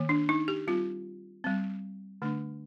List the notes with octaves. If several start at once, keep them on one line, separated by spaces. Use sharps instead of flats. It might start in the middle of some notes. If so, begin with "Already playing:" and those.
Already playing: D#3 A#3
D4
D#4
G4
G3 C4 F4
G3 C4
D3 A3 D4